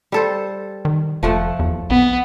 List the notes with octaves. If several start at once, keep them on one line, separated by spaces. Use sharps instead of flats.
G3 A4 C5
D#3
F1 F3 A3 F#5
E2
B1 B3